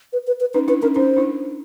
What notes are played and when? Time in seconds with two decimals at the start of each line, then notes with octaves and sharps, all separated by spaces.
0.13 B4
0.27 B4
0.40 B4
0.54 C#4 D#4 B4
0.68 D4 E4 B4
0.82 C#4 D#4 A#4
0.96 C#4 D#4 C5
1.17 D4 E4